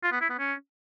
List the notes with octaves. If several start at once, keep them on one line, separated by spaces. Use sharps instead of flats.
F4
B3
E4
B3
C#4